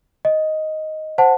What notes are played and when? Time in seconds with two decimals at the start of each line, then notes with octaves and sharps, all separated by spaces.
0.25 D#5
1.18 C5 F#5 A5